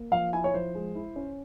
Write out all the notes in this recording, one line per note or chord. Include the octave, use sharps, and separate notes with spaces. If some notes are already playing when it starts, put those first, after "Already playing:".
Already playing: A#3
F3 F5
E4 G#5
C#5
F3 C5
G#3
E4
C#4